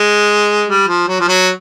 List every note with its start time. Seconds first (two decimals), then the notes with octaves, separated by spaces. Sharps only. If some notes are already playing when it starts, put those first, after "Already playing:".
Already playing: G#3
0.68 G3
0.87 F3
1.08 F#3
1.20 F3
1.28 F#3